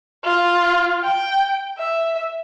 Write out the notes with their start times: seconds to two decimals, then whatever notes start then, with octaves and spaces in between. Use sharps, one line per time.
0.24 F4
1.03 G5
1.78 E5